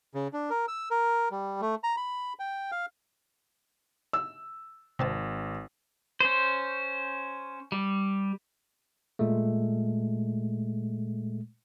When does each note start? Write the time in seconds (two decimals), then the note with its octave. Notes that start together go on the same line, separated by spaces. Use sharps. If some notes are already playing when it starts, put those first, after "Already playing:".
0.14 C#3
0.33 D4
0.50 A#4
0.68 E6
0.91 A#4
1.31 G3
1.61 A3
1.84 A#5
1.97 B5
2.39 G5
2.72 F5
4.13 E6
4.99 G#1 C3 C4 A5
6.20 C#4 C5
7.72 G3
9.19 A#2 G#3 A3